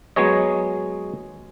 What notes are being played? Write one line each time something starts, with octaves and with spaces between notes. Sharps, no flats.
F#3 G#3 B3 G#4 C#5 D#5